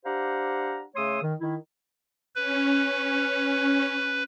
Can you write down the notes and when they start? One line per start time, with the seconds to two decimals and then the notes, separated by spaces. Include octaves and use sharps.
0.04 D4 G4 C5 F5 F#5 A#5
0.95 C#3 A3 C#5 C6 D#6 E6
1.22 D#3
1.40 D#3 E4
2.35 C#4 B4